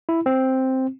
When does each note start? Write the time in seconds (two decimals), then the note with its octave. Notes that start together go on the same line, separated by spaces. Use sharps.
0.09 E4
0.26 C4